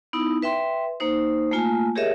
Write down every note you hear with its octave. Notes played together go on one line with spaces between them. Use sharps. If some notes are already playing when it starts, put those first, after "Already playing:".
B3 D#4 E4
B4 E5 G5 C6
A#3 D#4 C5
A3 A#3 F4 G#5 A5
G4 G#4 A#4 C#5 D#5 E5